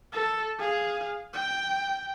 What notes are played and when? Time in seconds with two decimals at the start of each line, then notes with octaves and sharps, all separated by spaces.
0.13 A4
0.60 G#4 F5
1.33 G5